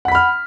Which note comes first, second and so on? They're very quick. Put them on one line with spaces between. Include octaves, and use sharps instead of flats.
F#5 B6 B5 F6